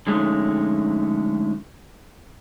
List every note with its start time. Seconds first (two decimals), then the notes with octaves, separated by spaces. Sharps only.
0.07 D3 F3 G#3 A3 C#4 D#4